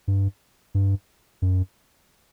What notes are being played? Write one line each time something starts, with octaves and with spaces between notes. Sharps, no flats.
G2
G2
F#2